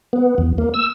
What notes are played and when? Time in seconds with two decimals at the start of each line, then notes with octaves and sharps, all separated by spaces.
0.13 B3
0.38 E2
0.58 A#3
0.74 E6